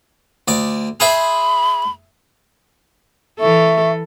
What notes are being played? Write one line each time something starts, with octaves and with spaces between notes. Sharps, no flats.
D2 D5
G#4 C5 E5 B5
E3 A4 E5 C#6